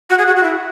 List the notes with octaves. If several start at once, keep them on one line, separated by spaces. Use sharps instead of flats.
F#4
G#4
F#4
F#4
E4